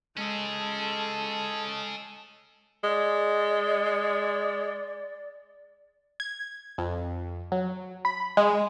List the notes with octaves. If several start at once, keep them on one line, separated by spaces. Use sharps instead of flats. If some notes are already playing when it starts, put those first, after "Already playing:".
G#3 C#4 G#4 A4
G#3 D5
G#6
F2
F#3
B5
G#3